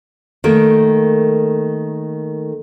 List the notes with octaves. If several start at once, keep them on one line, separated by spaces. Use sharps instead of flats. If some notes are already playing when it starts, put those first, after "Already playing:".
D#3 A3 A#3